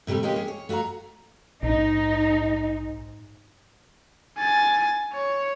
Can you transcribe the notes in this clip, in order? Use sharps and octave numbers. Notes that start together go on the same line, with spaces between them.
A2 C3 D#3 G3 A3
G#3 A#3 C#4 G4
G#4
C#5
A3 F#4 C#5 F5 A#5
A#1 G#2 D#4
G#5 A6
C#5